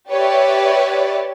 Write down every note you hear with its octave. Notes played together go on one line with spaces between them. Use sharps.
G4 B4 C#5 D5 E5